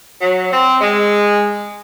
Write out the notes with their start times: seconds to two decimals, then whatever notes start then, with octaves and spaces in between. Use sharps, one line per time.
0.20 F#3
0.51 C4
0.80 G#3